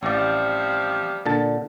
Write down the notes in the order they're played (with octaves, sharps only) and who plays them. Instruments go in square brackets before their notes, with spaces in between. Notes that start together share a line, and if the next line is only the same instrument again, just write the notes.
[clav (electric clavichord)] A1 D5 [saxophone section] C3 F3 G3
[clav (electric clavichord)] A#2 D3 A5